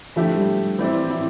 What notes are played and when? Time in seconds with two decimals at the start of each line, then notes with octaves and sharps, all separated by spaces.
0.16 D3 F3 A3 E4 G4
0.36 G3
0.79 E3 G3 C4 E4
1.10 E4